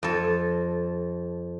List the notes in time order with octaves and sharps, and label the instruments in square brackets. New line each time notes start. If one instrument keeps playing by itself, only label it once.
[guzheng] F2 A4